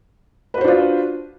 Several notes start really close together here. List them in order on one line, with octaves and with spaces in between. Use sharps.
B4 F#4 C5 D4 F4